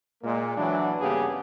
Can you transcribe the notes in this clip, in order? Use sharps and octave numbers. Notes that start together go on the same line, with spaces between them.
A#2 G#3 A#3
E3 F#3 D4
G2 C#3 A#3 B3 G4 G#4